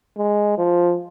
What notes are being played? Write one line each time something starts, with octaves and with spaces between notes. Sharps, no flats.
G#3
F3